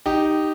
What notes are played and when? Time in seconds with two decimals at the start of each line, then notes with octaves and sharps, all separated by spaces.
0.06 D#4 G4